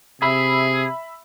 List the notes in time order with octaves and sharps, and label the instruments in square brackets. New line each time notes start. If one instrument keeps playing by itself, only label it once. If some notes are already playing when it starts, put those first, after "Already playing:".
[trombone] C3 [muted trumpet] G#4 [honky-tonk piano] E5 B5 E6